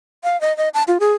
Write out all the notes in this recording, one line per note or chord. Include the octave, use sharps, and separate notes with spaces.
F5
D#5
D#5
A5
F4
G#4